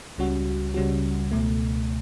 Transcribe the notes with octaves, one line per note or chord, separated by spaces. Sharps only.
C#2 C#3 G3 C#4 F#4
C#2 C#3 G3 C#4 F#4
C#2 B2 A3